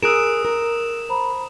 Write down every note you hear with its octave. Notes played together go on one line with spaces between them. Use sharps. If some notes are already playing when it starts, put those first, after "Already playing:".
G#4 A#4 D#6 E6 F#6 D7 E7
A#4
C5 A#5 B5